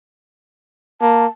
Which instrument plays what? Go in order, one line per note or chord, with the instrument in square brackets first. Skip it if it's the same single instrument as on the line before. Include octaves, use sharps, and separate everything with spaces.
[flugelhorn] A#3 [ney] A5